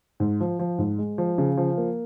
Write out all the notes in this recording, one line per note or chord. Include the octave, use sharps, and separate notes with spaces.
G#2
F3
F3
G#2
G#3
F3
C#3
F3
A#3